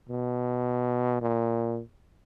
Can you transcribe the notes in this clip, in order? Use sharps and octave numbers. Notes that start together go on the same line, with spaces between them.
B2
A#2